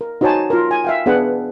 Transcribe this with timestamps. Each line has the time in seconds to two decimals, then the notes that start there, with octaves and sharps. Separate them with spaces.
0.01 A#4
0.21 D#4 F#4 C5 C#5 G#5 A5
0.50 F4 A#4
0.71 G#5
0.85 E5 F5 G5
1.06 B3 D4 G#4 B4 F#5